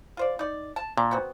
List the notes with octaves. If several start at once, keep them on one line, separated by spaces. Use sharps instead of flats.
F4 C5 D5
D#4 D5
A5
A#2 D4
B3 C4 F#4